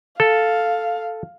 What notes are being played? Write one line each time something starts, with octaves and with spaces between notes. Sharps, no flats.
A4 F5